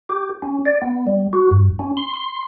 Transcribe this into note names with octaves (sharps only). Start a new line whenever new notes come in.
G4
C#4
D5
B3
G3
F#4
G2
C#4
C6
C6